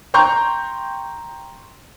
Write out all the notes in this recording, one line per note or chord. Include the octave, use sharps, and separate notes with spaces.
G5 A#5 C6 C#6 G6